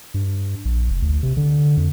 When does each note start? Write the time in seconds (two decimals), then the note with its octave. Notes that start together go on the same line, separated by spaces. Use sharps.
0.14 G2
0.65 A#1
0.90 F1
1.02 D2
1.23 C3
1.37 D3
1.77 F2